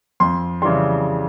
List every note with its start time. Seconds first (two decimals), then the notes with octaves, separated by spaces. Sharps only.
0.20 F2 C6
0.62 C#3 E3 G3 C6